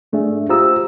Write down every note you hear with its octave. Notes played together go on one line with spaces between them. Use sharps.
G#2 A3 D4 G#4 E5
F4 G4 C5 A#5 D#6 E6